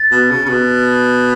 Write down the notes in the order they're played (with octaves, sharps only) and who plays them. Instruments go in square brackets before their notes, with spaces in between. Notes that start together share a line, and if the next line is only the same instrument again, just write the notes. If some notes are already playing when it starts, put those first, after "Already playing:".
Already playing: [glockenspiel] A6
[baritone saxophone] B2
C#3
C#3
B2